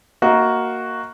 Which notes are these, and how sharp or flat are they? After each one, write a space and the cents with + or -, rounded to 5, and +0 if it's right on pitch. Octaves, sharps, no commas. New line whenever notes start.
A#3 +0 F#4 +0 D#5 +40